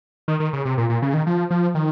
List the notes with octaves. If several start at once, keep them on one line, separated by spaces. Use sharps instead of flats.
D#3
D#3
C#3
C3
A#2
A#2
C#3
D#3
F3
F3
D#3